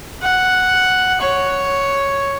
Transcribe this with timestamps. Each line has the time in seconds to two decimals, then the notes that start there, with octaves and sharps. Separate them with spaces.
0.22 F#5
1.21 C#5